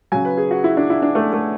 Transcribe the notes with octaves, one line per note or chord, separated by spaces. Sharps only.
C#3 F#3 G#5
B4
G#4
F#4
E4
D4
E4
D4
A3
A3